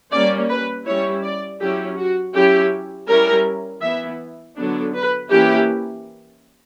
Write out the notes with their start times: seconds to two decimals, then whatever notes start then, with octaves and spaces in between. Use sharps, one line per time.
0.12 G3 A#3 C#4 D5
0.49 B4
0.86 G3 C#4 E4 C#5
1.23 D5
1.60 F#3 C#4 E4 G4
1.97 F#4
2.34 F#3 C#4 E4 G4
3.08 G3 C#4 E4 A#4
3.82 E3 B3 E4 E5
4.56 D3 F#3 B3 D4
4.94 B4
5.30 E3 A#3 C#4 E4 G4